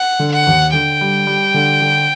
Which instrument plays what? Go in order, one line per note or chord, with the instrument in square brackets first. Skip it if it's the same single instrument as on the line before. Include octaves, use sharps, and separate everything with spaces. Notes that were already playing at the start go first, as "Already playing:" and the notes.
Already playing: [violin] F#5
[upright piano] D3
[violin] F#5
[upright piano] D#2
[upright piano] D3 [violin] G5
[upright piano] G3
G3
D3
D3